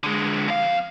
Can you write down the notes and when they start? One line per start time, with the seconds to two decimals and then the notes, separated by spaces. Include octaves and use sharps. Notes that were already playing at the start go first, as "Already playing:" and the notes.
0.03 D3 G#3
0.48 F2 F5